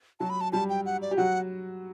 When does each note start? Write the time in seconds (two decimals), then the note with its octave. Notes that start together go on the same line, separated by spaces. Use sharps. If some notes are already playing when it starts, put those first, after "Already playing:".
0.20 F#3 F#4 A5
0.30 B5
0.41 A5
0.52 G3 G4 A5
0.70 G5
0.86 F#5
1.02 D5
1.11 G4
1.17 F#3 F#4 F#5